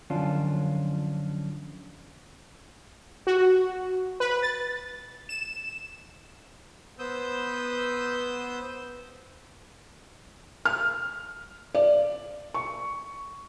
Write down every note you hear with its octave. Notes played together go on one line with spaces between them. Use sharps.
F#2 D3 F3 C#4 D4 F4
F#4
B4
A6
E7
B3 C5 D#6 E6 G6
F6
D5
C#6